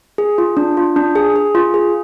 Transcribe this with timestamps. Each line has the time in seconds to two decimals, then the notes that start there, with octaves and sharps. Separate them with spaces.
0.18 G#4
0.38 F4
0.57 D4
0.77 F4
0.96 D4
1.15 G#4
1.36 G#4
1.55 F4
1.74 G#4